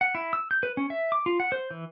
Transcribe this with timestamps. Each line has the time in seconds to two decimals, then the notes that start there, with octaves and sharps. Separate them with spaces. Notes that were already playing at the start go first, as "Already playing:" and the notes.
0.01 F#5
0.15 E4
0.33 E6
0.51 G6
0.63 B4
0.77 C#4
0.90 E5
1.12 D6
1.26 F4
1.40 F#5
1.52 C5
1.71 E3